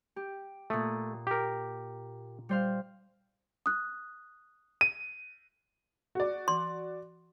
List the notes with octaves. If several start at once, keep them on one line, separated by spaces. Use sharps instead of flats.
G4
A#2 A3 D#6
G4 A#4
G3 C5 F5
D#6 F#6
D#7
F#4 D5
C6